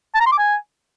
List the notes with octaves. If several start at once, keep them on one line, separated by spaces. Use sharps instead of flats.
A5
A#5
C6
D6
G#5